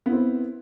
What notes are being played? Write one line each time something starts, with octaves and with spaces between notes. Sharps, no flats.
B3 C4 E4